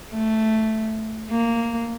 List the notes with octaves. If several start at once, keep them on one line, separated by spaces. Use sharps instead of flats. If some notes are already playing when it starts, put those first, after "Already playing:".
A3
A#3